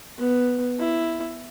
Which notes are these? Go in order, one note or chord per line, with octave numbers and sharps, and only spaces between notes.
B3
E4